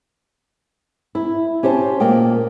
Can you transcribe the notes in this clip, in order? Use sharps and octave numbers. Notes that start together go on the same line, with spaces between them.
E4
C#4 G4 C5 A5
A#2 A#3 D#5 G5